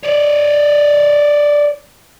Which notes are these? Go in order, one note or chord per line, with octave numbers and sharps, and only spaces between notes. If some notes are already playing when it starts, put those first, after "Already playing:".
C#5 D5